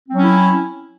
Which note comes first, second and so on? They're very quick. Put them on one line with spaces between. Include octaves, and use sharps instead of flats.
C4 F#3 C#4 E4